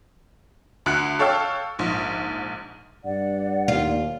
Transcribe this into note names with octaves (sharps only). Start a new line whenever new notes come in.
D2 F#6 C#7
A4 C#5 F5 G5 E6
A#1 G#2
G2 D5 F#5
D#2 F4